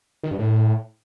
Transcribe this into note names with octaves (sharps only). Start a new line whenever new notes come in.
D#3
G2
A2